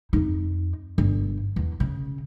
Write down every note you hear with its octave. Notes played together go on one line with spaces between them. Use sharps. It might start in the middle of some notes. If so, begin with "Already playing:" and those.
F2 D#4
G1
E2
C#3